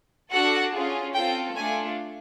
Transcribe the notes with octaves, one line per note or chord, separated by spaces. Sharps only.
D4 F#4 A4 F#5
C#4 F4 G#4
C4 F4 A4 G5
A3 D4 F4 G#5